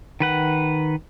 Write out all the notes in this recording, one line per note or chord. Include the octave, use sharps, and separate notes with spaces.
D#3 B4 F#5